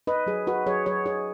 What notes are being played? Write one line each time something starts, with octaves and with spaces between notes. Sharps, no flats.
D#4 B4 D#5
F#3 G#4
D#4 F#4 B4
F#3 G#4 C#5
F#3 G#4 C#5
D#4 G#4 C#5